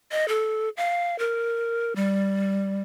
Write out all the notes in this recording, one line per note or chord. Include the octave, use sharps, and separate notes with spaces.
D#5
A4
F5
A#4
G3